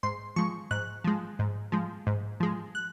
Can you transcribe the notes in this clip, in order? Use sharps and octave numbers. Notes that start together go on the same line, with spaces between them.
G#2 C6
F3 G#3 C#6
G#2 F#6
F3 G#3
G#2
F3 G#3
G#2
F3 G#3
F#6